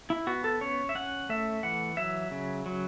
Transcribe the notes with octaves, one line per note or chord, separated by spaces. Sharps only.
E4
B3 F#4
A4
C#4 C#5
E5
C#4 F#5
A3 E5
E3 F#5
F#3 E5
C#3
F#3